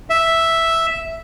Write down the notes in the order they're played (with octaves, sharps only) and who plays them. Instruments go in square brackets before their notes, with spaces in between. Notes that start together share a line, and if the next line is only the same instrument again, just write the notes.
[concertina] E5